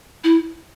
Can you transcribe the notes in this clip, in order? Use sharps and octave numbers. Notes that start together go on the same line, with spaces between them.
E4